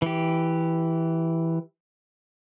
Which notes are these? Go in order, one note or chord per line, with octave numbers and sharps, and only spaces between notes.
E3 G4